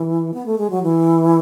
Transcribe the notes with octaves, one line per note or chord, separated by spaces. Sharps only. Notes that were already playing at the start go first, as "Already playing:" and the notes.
Already playing: E3
B3
A3
G#3
F#3
E3